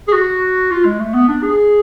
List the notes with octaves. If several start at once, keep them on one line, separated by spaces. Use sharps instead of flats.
G#4
F#4
F4
G#3
A3
B3
D4
G#4